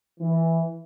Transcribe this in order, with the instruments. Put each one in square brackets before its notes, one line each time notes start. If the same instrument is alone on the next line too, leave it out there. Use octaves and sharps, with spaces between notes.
[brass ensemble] E3